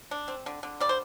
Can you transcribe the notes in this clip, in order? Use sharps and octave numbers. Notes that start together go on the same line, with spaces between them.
D4
C4
D3
D3
G3 D5
C5